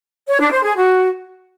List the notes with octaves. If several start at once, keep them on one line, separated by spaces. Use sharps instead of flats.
C#5
D4
C5
G#4
F#4